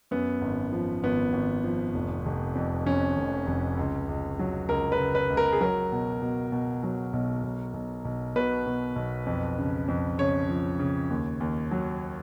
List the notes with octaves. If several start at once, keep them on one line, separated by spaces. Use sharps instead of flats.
F#2 B3
G#1
F3
G#1 B3
G#1
F3
F1
F1
F2
F2 C#4
F1
F1
C#2
C#2
F#3
C#2 A#4
B4
C#2
B4
C#2
A#4
G#4
F#3 A#4
B2
B2
B2
F#3
B1
B1
B1
B1
B2 B4
B2
B1
F2
C#3
F2
C#3 C#5
F3
C#3
D#2
D#2
F#3